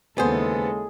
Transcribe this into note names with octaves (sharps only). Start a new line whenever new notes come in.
D#2 C#3 E3 G#3 B3 G#4 A4 C5